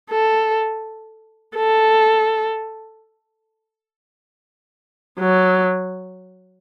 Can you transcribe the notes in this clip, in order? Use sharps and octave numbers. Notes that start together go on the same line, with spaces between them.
A4
A4
F#3